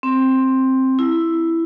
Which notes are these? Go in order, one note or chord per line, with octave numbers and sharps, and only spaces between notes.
C4
E4